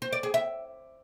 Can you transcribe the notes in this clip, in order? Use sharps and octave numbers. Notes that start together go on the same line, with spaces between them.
C5
D5
G#4
E5